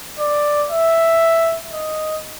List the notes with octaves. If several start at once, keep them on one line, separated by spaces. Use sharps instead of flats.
D5
E5
D#5